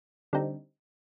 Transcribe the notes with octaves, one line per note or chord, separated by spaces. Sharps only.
D3 G3 C4 D#4